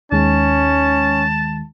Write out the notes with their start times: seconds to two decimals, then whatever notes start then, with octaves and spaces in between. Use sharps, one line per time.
0.12 D#2 D#3 G#3 C#4 A5